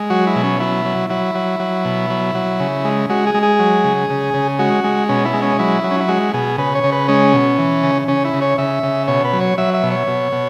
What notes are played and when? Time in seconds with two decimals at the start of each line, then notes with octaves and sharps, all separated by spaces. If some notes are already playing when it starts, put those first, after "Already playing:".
Already playing: G#3
0.10 F#3 F#4
0.27 E4
0.35 B2
0.43 C#4
0.60 F#3 E4
0.85 F#3
1.10 F#3 E4
1.35 F#3
1.60 F#3
1.85 B2
2.10 F#3
2.35 F#3
2.60 C#3
2.84 G#3
3.10 G#3 F#4
3.27 G#4
3.34 G#3
3.43 G#4
3.59 F#3
3.84 C#3
4.10 C#3
4.34 C#3
4.59 G#3 F#4
4.84 G#3
5.09 B2 C#4
5.25 E4
5.34 G#3
5.42 C#4
5.59 F#3 E4
5.84 F#3
5.91 C#4
6.00 E4
6.08 G#3 F#4
6.34 B2 G#4
6.58 C#3 B4
6.75 C#5
6.83 C#3
6.92 B4
7.08 G#3 C#4
7.33 B2
7.58 E3
7.83 C#3
8.08 C#3 C#4
8.25 E4
8.33 C#3
8.41 C#5
8.58 C#3 E5
8.83 C#3
9.08 B2 C#5
9.25 B4
9.33 F#3
9.41 C#5
9.58 F#3 E5
9.74 E5
9.83 B2
9.91 C#5
10.07 B2
10.32 B2